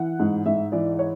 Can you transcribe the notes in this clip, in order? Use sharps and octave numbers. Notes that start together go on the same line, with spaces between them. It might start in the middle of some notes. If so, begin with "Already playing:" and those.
Already playing: E3 F#5
G#2
G#2 E5
E3 D5
C#5